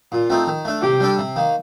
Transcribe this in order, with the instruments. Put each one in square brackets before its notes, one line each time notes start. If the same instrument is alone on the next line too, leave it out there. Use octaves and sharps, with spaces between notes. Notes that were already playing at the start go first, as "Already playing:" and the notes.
[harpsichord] A#2 [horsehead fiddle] F4
[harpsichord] A3 C4 D#4
D#3
A3 D4
[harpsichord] C3 [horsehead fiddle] G4
[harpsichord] G3 D4 A4
C3
D#3 A#3